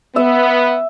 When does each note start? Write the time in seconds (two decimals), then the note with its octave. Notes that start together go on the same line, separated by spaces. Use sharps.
0.16 B3 E5